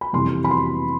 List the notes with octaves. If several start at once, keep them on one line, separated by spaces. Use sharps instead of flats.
B5
F2 C3 E3 G3 C6
B5
C6